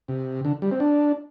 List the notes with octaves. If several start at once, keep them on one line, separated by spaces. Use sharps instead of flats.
C3
D3
G3
C4
D4